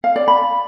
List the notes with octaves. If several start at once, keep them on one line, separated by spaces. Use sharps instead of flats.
F5
D5
B5